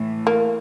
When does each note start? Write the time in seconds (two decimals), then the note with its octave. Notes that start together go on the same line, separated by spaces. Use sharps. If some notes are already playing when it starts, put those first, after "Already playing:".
Already playing: A2 E3 A3
0.27 A#3